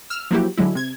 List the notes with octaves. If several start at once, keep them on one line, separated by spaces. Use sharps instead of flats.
E6 F6
F3 F#3 A#3 E4 F#4 G4
D3 F#3 G#3 E4
C3 G#6